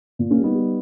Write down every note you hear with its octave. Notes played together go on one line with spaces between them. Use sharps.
A#2
A#3 C#4
G3
B3 D#4
G3